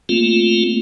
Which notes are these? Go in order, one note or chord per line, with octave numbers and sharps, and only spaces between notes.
A3 A#3 C4 F4